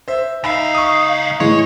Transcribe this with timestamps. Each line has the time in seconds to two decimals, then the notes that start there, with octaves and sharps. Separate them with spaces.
0.08 C5 E5
0.44 C#2 D#4 E5 F5 B5
0.75 C#6 D#6
1.40 A2 E3 G#3 C#5